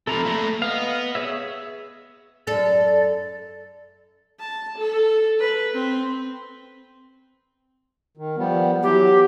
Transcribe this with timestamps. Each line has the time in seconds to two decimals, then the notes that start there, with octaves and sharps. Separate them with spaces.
0.07 C3 F3 A4 A#5 B5
0.25 A#2 A3
0.62 B3 D#5 F5
1.15 G#4 C#5 E5
2.47 F#2 A4 D5
4.40 A5
4.78 A4
5.39 B4
5.74 C4
8.17 D#3
8.37 F3 G3 B3
8.83 E3 F#3 B3 G4